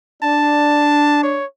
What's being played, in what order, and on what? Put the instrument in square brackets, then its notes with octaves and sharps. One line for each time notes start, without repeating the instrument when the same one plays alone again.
[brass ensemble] D4 [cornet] A5
[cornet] C#5